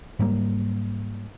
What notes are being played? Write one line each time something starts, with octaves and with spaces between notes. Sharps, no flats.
G#2 F#3 G3 A#3